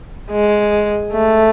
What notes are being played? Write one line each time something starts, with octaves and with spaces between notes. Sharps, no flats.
G#3
A3